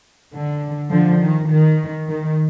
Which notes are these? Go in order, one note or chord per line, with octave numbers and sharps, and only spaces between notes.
D3
D3 F3
D#3
D#3
D#3